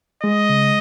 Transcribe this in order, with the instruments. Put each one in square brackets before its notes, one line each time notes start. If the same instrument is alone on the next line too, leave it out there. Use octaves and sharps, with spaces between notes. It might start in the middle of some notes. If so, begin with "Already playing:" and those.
[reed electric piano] G#3 [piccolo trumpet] D#5
[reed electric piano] C#3